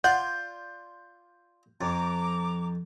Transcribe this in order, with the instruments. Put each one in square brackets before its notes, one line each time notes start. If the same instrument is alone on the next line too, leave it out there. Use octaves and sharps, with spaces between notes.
[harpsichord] F4 D5 C6 [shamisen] F#5 [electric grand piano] G6
[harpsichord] F2 [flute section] A#5 D6